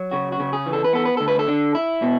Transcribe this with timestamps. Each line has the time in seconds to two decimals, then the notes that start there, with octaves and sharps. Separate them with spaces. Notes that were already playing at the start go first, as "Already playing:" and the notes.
Already playing: F#3
0.11 C#3 F#4
0.32 F#4
0.40 C#3
0.53 G#4
0.66 E3
0.73 A4
0.84 B4
0.93 B3 A4
1.05 B4
1.17 D2 A4
1.28 B4
1.39 A4
1.48 D3
1.75 E4
2.02 B2